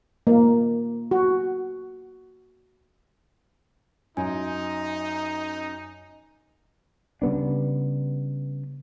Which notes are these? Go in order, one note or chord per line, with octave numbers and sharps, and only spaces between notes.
A#3
F#4
F#2 D#4 G#5 C6
C#3 G3 B3 D4